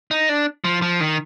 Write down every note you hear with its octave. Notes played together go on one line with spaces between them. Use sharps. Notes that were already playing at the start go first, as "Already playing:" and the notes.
D#4
D4
F3
F3
D#3